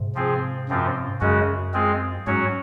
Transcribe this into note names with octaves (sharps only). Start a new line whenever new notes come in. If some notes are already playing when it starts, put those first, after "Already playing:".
Already playing: G#2 C3
F3 C4 F4 G#4
F#2 F3 C4 F4
F#2 C#3 G#3 C#4 F#4
G#3 C4 F4 G#4
G#2 F#3 C#4 F#4 C#5